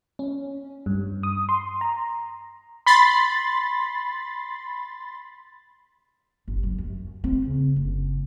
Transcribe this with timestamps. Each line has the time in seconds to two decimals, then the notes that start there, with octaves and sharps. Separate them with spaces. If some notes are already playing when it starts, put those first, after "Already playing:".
0.19 C#4
0.86 G2
1.23 D#6
1.49 C6
1.81 A#5
2.86 B5 C6 A6
6.48 G1
6.63 F#3
6.78 F#2
7.24 C4
7.46 C#3
7.76 F#1